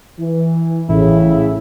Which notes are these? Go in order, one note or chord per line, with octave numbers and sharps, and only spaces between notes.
E3
A1 A2 C#3 E4